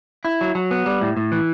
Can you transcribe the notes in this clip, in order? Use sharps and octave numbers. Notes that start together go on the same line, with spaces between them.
E4
F#3
F#3
B3
G3
A2
A2
E3